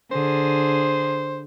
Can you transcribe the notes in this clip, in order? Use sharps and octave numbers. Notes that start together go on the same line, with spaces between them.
D3 G#4 C5